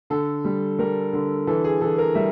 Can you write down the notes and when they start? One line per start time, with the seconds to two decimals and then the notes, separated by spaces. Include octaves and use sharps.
0.10 D3 A4
0.44 G3
0.79 G3 A#4
1.13 D3
1.47 E3 A4
1.64 G#4
1.81 E3 A4
1.98 A#4
2.15 G3 E5